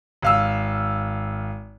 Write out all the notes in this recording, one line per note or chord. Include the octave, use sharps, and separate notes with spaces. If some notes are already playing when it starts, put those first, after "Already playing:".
G#1 F5 E6